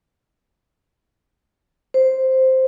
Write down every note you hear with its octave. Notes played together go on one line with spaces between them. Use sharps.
C5